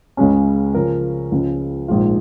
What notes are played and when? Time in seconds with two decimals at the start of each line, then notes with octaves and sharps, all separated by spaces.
0.17 C#2 C#3 G#3 C#4
0.75 C#3 F3 C#4 A#4
1.32 C#2 C#3 F3 G#3 C#4
1.88 A#1 G#2 F3 G#3 F4